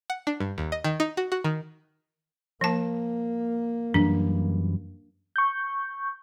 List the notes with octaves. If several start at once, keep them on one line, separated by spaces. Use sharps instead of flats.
F#5
D4
G2
D#2
D#5
D#3
D#4
F#4
F#4
D#3
F3 A#3 A5
F#2 E3 G3 D4
C#6 G6